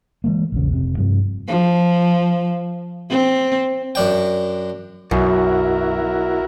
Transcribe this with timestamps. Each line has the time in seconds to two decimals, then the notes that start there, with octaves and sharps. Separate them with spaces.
0.24 E3 G#3 A#3
0.52 A#1 E2 C#3
0.73 F1 C3
0.98 G2 C3 F3
1.48 F3
3.10 C4
3.95 F#2 D4 G5
5.11 B1 F#2 E4 F#4 A#4